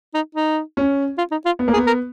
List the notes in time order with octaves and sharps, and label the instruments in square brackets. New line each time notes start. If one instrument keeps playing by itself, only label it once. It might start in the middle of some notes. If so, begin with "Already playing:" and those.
[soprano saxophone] D#4
D#4
[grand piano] C#4
[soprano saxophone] F4
D#4
F4
[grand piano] B3
A#3
[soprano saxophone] G#4
[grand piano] B3
[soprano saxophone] A#4